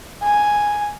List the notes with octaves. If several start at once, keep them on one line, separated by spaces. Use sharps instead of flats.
G#5